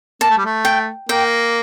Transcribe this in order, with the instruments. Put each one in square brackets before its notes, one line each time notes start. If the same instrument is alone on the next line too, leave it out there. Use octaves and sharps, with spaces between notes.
[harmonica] A#3 [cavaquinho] A5
[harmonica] A3
G3
A3
[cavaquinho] G5
[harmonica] A#3 [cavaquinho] G5